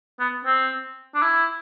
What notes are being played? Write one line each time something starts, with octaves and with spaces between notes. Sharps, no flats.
B3
C4
D4
E4